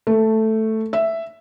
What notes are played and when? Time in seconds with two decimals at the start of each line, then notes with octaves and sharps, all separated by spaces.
0.07 A3
0.93 E5